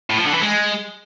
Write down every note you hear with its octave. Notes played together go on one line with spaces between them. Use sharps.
A2
F3
D3
E3
G#3